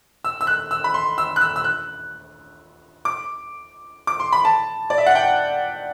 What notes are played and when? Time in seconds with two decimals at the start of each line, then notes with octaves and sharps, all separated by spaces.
0.25 E6
0.41 E6
0.47 F#6
0.71 E6
0.84 B5
0.94 C6
1.18 E6
1.36 F#6
1.41 E6
1.56 E6
1.64 F#6
3.05 D6
4.07 D6
4.20 C6
4.32 B5
4.45 A5
4.90 D5
4.98 E5
5.06 F#5
5.15 G5